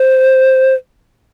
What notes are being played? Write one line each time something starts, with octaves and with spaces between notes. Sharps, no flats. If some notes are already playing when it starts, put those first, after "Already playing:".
Already playing: C5